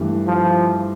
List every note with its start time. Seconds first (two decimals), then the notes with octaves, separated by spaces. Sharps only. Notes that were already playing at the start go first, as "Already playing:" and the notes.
Already playing: G2 E3 A3
0.27 F3